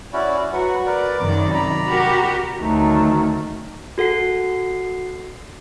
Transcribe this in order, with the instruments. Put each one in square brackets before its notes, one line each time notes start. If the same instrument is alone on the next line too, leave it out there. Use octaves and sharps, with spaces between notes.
[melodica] C#4 E4 F#4 [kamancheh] D5
[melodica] F#3 B4 F#5 [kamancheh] F#4
[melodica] A#4 B4 [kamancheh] D5
[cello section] F#2 C3 D#3 [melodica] D6
[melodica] D5 A#5 [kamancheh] B5
[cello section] F#4 G4 A#4
[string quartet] D2 D#3 F#3 A3
[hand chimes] F#4 A4 F#5 C7